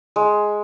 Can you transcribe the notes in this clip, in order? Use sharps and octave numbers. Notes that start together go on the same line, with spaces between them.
G#3